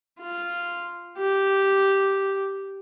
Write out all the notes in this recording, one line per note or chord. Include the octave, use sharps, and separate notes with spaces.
F4
G4